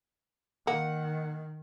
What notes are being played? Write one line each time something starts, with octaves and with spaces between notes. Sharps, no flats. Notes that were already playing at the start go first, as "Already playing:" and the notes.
D#3 A#3 F#5